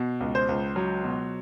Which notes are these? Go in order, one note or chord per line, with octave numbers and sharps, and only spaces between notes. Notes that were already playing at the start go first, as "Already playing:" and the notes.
Already playing: B2
C#2
C5
C#2
F#3
B2